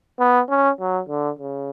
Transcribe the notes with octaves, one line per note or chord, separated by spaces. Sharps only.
B3
C#4
F#3
D3
C#3